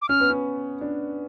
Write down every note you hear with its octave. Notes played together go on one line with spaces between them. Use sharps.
D6
C#4 F6
B3
C#4
D4